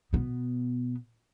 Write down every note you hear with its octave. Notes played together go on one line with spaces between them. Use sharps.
B2 B3